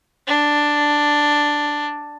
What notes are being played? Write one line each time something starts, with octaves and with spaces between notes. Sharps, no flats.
D4